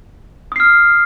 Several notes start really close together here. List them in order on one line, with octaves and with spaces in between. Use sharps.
D#6 C7 F6